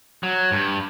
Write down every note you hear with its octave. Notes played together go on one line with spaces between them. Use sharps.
F#3
G2